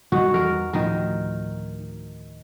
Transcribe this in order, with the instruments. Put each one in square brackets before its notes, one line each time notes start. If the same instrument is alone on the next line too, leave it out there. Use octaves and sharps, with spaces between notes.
[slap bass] G2 D3 D#3 [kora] D#4 F#4
[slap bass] E2 E3 G3 [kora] A#4
[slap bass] D2 A2 F3 [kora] D#3 A#4